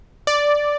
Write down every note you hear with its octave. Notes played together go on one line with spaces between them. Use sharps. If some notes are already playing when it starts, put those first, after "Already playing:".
D5